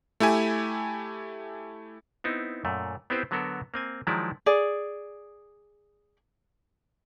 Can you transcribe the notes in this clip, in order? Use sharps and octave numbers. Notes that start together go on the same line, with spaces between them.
A3 E4 G4 G#5
B3 C4 D#4 E4
F#2 A#2 A3
B3 C4 E4 G4 B4 C5
D3 F#3 B3 F#4 A4 A#4
A#3 C4 G#5
D#3 F3 F#3 G#3 E4 D5
G#4 D5